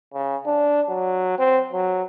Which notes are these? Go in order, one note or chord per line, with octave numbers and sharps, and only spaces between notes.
C#3
D4
F#3
C4
F#3